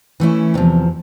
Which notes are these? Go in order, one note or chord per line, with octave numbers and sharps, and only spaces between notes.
E3 A3 C#4 E4
E2 C3 F3